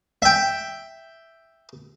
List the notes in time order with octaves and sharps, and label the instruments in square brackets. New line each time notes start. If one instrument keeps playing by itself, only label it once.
[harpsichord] E5 G5